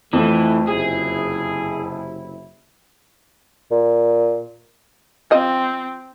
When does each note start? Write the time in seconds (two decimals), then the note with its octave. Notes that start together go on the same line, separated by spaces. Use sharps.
0.13 F2 E3 A3
0.67 F#1 C3 E4 G#4
3.71 A#2
5.31 F3 C4 D#5